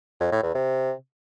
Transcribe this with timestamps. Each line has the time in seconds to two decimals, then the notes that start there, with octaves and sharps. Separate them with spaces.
0.20 F2
0.32 A2
0.43 E2
0.55 C3